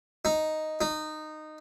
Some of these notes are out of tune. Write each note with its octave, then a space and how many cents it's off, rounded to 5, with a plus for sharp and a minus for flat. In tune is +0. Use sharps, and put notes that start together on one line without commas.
D#4 +0
D#4 -15